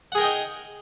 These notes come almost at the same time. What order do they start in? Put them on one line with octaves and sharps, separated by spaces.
F#5 G#4 A#4 G5 D#4